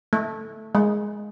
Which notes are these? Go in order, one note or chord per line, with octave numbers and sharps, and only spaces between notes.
A3
G#3